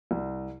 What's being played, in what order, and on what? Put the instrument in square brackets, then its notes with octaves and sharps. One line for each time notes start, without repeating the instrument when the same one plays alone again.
[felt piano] C2